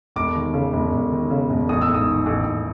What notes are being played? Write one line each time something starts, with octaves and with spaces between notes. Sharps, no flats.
E1 D6
D#2
C#3
E1
E1
D#2
C#3
E1
A1 D#6
E6
G#2
D#6
D#3
A1
A1